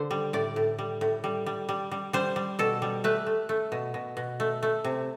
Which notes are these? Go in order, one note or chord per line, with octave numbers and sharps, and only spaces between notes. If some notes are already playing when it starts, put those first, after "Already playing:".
Already playing: D3 C5
G3
A2 D5
A2
G3
A2
G3
G3
G3
G3
G3 C5
G3
B2 A4
G3
A3 B4
A3
A3
B2
B2
B2
A3
A3
C3